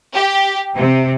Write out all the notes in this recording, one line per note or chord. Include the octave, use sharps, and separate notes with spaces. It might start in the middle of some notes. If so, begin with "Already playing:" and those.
G4
C3